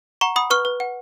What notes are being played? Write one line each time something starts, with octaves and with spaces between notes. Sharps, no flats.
F#5 A#5 C#6
F#5 B5 D#6
B4 C#6 F6
B4
F#5